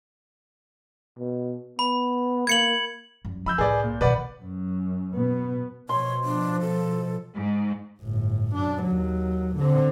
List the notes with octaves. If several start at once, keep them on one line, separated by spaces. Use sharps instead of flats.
B2
B3 B5
A#3 G#6 C#7 F#7
F#2 G3
F3 B5 E6 G6
C2 A2 G#4 B4 D5
A#2
B2 D#3 B4 D5 F#5
F#2
B2 B3
B2 F3 C#5 C6
D4
A4
G#2
G1 A2
F#2 D4
D#2 F#3
D3 C4